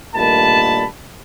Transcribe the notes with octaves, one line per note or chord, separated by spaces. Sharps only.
G2 A#2 D#3 A3 A5 B5